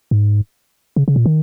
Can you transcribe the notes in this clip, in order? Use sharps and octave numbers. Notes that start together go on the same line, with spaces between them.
G#2
C#3
C#3
A#2
D#3